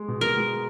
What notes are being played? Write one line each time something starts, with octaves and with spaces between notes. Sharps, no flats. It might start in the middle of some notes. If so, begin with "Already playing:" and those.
Already playing: G#3
B2
A#4
G#3